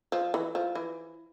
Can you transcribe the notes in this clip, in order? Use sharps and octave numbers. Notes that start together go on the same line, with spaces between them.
F3
E3
F3
E3